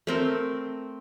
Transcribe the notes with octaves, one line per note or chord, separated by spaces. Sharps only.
A3 C4 A#4